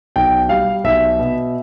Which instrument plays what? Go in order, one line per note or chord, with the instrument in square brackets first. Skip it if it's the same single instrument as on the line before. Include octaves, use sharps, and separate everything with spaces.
[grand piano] B1 G5
G3 F5
B1 E5
B2